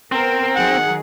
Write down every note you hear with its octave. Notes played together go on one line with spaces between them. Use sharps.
B3 C4 A#4
D#3 F#3 G#4 F#5